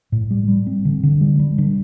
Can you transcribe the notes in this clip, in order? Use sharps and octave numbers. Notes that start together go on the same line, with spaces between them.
A2
G3
G3
C4
D3
D3
G3
G3
D3